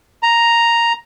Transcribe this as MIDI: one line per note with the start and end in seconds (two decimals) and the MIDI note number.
0.23 0.93 82